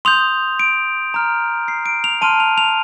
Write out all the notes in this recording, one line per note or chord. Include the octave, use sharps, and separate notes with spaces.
C6 D#6 G6 F7
D7
A#5 F6
C7
D7
F7
A5 C6 F6 D#7
F7
F7